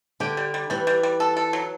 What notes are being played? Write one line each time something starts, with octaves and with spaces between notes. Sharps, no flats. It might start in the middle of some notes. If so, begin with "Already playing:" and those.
D3 G4
G3
G3
E3 G3
G3
G3
A4
A4
F#3